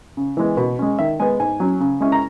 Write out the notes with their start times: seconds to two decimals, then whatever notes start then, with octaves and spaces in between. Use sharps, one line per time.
0.17 C#3
0.37 E3 G#3 B3
0.57 B2
0.79 G#3 C#4
0.99 D#3 E5
1.20 G#3 B3 G#5
1.40 G#2 G#5
1.60 F#3 C#4
1.80 C#3
2.00 G#3 C#4 E4
2.12 A#5